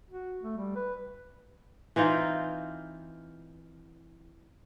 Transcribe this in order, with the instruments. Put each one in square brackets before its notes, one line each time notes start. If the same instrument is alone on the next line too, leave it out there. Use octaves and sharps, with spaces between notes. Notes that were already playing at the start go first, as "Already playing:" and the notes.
[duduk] F#4
A3
G3
B4
[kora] E3 C4 D#4 F4